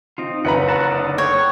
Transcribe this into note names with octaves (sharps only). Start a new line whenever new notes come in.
C4 D#4 F4
F#1 B4 F#5 A#5 B5
F#4 F#5 A5
D3 D#4 D5
C#5 F#5 G5